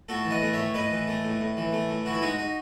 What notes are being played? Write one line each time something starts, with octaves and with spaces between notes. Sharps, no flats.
A2 F#4 A4
E3
D#5 F#5
A3
A2 C#5 E5
A2 B4 D#5
E3
A3
A2
A2
E3
A3
A2
E3 F#4
E4
G#3 D#4 F#4
D#4